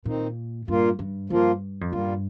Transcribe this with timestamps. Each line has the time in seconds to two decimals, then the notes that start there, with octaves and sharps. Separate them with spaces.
0.05 A#2 D#3 C4 D#4
0.68 G2 A#2 A#3 F4
0.99 G2
1.30 G2 F3 A#3 F4
1.81 F2
1.92 G2 A#2 G3 A#3 F4